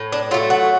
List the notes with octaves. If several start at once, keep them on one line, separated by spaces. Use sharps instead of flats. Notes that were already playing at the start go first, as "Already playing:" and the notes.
Already playing: A2
D4
F#3 A3 F4
F#4